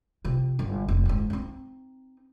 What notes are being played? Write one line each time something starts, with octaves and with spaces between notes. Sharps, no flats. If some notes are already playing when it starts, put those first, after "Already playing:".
C3 F3
G1
F1
G#2 C#3
C4 D#4